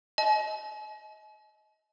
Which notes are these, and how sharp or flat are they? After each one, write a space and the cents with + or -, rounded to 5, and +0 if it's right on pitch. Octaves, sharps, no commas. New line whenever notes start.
D#5 +25 G#5 +45